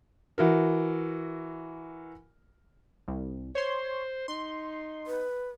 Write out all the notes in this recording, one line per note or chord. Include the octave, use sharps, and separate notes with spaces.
E3 F#4 A#4
C2
C5 C#5 C6
D#4 C6
B4